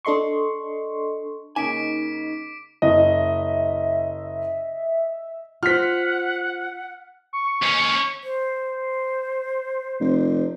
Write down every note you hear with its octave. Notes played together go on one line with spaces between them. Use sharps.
D4 A4 D#5 C6 C#6
C#3 A#3 C#4 D#4 G#5 D6 B6 D7
F#1 D#5 E5
F4 C5 F#5 F6 B6
C#6
D#2 C#4
C5
F1